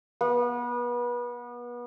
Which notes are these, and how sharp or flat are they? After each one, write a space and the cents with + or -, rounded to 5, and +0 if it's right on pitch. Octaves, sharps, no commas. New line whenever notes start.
B3 -30